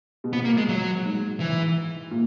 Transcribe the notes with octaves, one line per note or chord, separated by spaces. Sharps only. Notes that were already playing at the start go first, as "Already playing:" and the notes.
B2
A#2 B3
A#3
G#3
F#3
G#2
E3
A#2